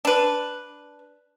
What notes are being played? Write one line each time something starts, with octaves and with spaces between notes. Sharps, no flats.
D4 B4